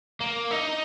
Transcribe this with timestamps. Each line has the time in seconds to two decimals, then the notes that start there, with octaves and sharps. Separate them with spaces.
0.20 A#3
0.51 D#4